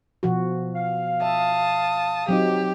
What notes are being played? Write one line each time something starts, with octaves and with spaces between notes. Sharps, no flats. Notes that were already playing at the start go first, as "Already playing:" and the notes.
B2 F3 F#4
F5
E5 A5 D#6
F#3 C4 D#4 G4